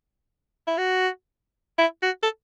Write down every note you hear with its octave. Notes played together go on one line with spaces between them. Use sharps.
E4
F#4
E4
F#4
A4